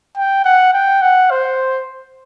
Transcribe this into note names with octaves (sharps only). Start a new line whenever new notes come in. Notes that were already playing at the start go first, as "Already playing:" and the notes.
G5
F#5
G5
F#5
C5